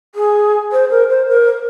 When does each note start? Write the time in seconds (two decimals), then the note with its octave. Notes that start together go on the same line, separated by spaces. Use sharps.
0.15 G#4
0.72 C5
0.91 A#4
1.10 C5
1.28 A#4